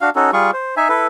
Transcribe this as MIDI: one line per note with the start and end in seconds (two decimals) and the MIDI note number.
0.01 0.10 62
0.01 0.10 66
0.01 0.10 77
0.16 0.31 61
0.16 0.31 63
0.16 0.31 66
0.16 0.31 69
0.33 0.51 55
0.33 0.51 65
0.33 0.51 68
0.33 0.51 85
0.54 0.75 72
0.77 0.88 63
0.77 0.88 76
0.77 0.88 80
0.89 1.07 64
0.89 1.07 69
0.89 1.07 71